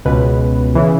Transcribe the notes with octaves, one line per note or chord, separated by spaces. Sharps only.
C#2 B2 B4
C#3 E3